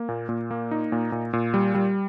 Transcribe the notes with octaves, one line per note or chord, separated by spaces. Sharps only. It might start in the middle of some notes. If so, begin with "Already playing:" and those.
Already playing: A#3
A#2
A#2
A#3
D#4
A#2
A#2
A#2
G3
G3